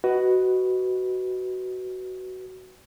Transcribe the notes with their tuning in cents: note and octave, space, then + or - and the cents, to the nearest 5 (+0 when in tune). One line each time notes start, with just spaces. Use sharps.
F#4 +15 B4 +0 D#5 +0